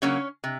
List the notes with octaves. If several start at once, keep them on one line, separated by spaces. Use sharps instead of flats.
C#3 F#3 A#3 C#4 C#5
C3